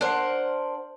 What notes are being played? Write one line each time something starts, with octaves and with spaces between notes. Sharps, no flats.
D4 A#4 C5 F#5